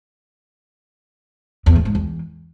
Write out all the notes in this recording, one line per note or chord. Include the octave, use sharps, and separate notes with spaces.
E2
A2
G#2
E2